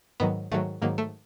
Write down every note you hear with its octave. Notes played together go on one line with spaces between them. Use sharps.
G#2 D#3 F#3 B3
G#2 D#3 F#3 A3
G#2 D#3 F#3 A#3
A3